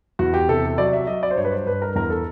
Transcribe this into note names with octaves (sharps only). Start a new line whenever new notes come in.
E2 F#4
G4
C3 A4
F#3 D5
E5
F#3 D#5
D5
C5
G2 C#5
B4
C5
G2 B4
A#4
E2 A#4
A4